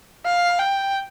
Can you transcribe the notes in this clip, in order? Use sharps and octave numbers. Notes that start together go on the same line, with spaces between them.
F5
G5